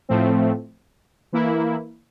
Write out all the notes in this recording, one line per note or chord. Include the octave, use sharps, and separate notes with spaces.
A2 F3 A3 C4
E3 A#3 E4